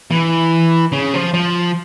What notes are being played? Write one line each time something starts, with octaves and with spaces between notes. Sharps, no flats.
E3
C#3
F3
F3